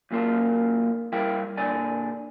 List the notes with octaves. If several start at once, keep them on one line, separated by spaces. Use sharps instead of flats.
F#2 A#2 A#3 F4 A#4 A5
G3 E4 A#4 E5 F5 G5
A#2 D3 D5 G#5